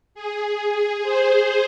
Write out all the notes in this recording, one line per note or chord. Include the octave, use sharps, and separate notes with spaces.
G#4
G#4
C5